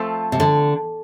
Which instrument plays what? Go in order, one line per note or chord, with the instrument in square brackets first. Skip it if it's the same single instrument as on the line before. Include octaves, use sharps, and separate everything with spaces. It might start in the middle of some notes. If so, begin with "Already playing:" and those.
Already playing: [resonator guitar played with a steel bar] F3 A3 C4 F4 A4
[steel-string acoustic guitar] C3
D3